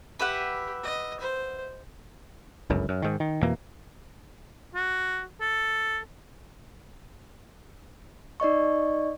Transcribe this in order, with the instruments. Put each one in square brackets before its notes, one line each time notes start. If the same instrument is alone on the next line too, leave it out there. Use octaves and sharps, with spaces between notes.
[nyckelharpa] G4 [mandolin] B4 E5 F#5
[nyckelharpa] D#5
C5
[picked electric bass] G1 C#2 F#2
F#2
G#2 D#3
D#3
F2 B2 E3 A#3
[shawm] F#4
A4
[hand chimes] D#4 D5 D#5 C#6